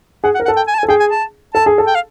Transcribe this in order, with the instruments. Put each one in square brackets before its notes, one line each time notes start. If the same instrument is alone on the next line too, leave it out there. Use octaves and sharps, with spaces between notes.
[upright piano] G#4 [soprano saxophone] F#5
[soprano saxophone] F#5
[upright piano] A#4
[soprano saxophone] F#5
[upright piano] A4
[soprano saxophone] G5
G#5
A5
G#5
[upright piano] A4
[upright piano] G#4 [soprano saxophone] G5
[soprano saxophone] G#5
A5
[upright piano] A4 [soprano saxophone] A5
[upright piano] G#4
A4
[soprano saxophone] G5
F5